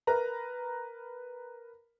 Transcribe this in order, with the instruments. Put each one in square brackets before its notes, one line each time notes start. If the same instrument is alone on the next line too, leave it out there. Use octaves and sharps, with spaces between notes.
[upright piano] A#4 B4 A#5